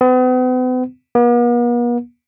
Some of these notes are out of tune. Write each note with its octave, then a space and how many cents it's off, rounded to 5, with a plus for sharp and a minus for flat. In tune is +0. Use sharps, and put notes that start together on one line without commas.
B3 +45
B3 -45